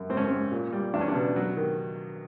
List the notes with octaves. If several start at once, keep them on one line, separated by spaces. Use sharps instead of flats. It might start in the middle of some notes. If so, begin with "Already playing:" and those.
Already playing: F#2
G#2 C4
C#4
C4
G#2
A#2
G3
E2 D4
C#4
D4
B2
F#3
D#3